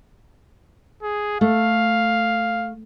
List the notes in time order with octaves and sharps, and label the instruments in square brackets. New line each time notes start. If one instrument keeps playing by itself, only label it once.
[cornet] G#4
[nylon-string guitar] A3 [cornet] F5